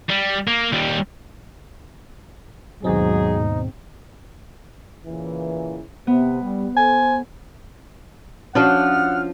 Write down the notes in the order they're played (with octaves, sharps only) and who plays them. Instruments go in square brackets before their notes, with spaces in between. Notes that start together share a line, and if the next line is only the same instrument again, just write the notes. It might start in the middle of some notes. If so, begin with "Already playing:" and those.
[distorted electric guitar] G3
A#3
D#2 G3
[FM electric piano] D#2 B2 C4 [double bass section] G#2 [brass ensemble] F#3 G#4 [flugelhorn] D#4
[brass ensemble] A#2 C#3 E3
[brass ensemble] C3 [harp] B3
[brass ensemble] G3
[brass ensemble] A4 C5 [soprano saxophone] G#5
[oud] F3 D4 F#4 [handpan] C#4 [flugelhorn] F#5 [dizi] F6